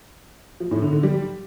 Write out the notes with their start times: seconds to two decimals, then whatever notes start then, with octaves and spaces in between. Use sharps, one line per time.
0.60 F3
0.71 A2
0.82 D3
0.93 D3
1.03 G3